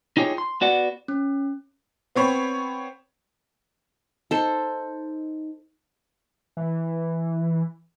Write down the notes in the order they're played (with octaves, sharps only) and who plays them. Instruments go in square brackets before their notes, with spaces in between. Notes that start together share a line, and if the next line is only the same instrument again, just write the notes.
[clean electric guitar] D#4 F4 G4 G#4 C#5
C6
B3 F#4 D5 F#5
[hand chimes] C#4
[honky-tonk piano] B3 C4 C#5 B5
[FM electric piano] D#4 [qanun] A4 C5
[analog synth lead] E3